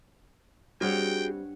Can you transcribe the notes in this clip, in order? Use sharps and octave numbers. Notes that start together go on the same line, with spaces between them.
G2 G3 C4 F#4 G#4 C#5 F#5 G5